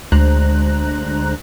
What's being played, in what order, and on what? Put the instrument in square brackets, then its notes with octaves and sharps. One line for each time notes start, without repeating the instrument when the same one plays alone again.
[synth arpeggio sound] D2 G#3 D4 C5 A#5 F#6